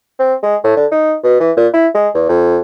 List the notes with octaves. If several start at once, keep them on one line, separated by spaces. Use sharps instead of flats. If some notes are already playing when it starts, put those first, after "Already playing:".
C4
G#3
A2
D3
D#4
B2
E3
A#2
E4
G#3
E2
F2